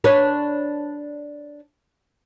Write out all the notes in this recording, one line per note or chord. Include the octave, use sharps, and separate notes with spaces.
D4 B4 C#5